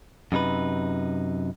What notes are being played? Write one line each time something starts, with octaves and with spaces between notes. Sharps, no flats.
F#2 C3 D#4 A#4 B4